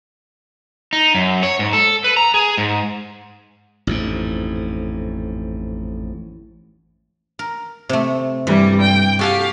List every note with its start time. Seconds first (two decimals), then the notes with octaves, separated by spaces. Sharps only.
0.93 D#4
1.15 F#2
1.43 C#5
1.59 G#2
1.73 A4
2.04 B4
2.17 A#5
2.34 G#4
2.57 G#2
3.87 A1 F2 G#2
7.39 A#4
7.89 C3 A3
8.47 G2 E3 G3
8.81 G5
9.19 F#4 G4 A4 F5 G#5